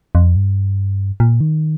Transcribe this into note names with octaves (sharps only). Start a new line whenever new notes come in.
F2
G2
A#2
D#3